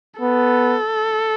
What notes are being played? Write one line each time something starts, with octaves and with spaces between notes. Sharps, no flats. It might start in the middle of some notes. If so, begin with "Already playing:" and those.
B3 A4